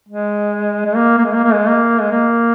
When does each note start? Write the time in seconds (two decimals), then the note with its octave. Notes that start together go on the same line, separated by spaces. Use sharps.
0.09 G#3
0.85 G#3
0.96 A#3
1.18 A#3
1.24 G#3
1.34 A#3
1.44 A#3
1.53 G#3
1.68 A#3
2.01 G#3
2.11 A#3